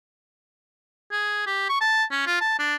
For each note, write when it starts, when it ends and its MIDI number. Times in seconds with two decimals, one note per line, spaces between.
1.12 1.43 68
1.46 1.65 67
1.69 1.76 85
1.81 2.04 81
2.11 2.25 61
2.26 2.36 65
2.41 2.56 81
2.59 2.75 62